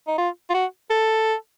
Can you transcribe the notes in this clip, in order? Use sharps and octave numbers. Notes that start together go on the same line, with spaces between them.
D#4
F4
F4
F#4
A4